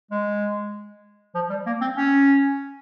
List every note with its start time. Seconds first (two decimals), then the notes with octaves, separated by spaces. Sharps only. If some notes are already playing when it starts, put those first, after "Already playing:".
0.11 G#3
1.35 F3
1.50 G3
1.66 A#3
1.81 C4
1.97 C#4